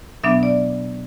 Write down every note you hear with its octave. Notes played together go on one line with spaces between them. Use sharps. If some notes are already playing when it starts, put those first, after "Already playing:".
B2 F#3 B3 D4 E5
D5